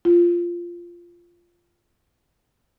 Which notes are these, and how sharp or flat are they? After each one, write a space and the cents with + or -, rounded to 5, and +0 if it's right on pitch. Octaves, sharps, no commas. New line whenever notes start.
F4 -10